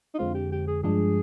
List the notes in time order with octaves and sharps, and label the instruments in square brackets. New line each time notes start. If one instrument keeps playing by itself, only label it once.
[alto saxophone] D#4
[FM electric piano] F2 D3 G#3 C4 [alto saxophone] F4
[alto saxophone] G4
G4
G#4
[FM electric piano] G2 F3 G#3 D4 [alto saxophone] G#4